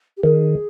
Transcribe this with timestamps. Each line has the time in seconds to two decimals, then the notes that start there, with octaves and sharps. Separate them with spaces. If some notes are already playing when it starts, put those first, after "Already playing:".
0.17 G4
0.23 D#3 G#4